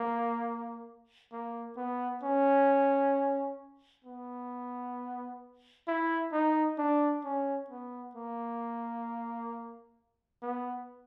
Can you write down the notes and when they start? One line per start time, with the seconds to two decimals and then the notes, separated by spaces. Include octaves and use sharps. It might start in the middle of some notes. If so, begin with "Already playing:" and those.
Already playing: A#3
1.32 A#3
1.77 B3
2.23 C#4
4.04 B3
5.88 E4
6.32 D#4
6.78 D4
7.24 C#4
7.70 B3
8.15 A#3
10.42 B3